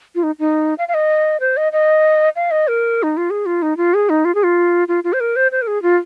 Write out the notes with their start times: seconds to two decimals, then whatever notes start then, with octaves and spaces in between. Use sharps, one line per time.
0.15 F4
0.23 D#4
0.39 D#4
0.78 F5
0.88 F5
0.94 D#5
1.40 C5
1.57 D#5
1.72 D#5
2.36 F5
2.51 D#5
2.68 A#4
3.03 D#4
3.17 F4
3.30 G#4
3.46 F4
3.62 D#4
3.77 F4
3.94 G#4
4.10 D#4
4.25 F4
4.35 G#4
4.44 F4
4.88 F4
5.04 F4
5.13 C5
5.20 A#4
5.36 C5
5.52 C5
5.62 A#4
5.67 G#4
5.83 F4